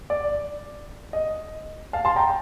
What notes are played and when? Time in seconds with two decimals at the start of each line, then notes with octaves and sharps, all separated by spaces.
0.10 D5
1.13 D#5
1.93 F5 A5
2.05 A5 C6
2.16 G5 A#5